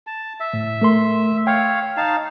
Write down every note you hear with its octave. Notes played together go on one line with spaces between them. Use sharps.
A5
E5
A2
A3 A#4 C6
C#5 F5 G5
D#4 F5 A5